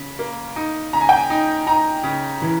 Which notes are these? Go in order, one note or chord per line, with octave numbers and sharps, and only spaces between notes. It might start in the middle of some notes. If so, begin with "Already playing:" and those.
Already playing: C#3
A#3
D#4
C#3 A#5
G#5
G5
G#5
D#4
D#4 A#5
C#3
E3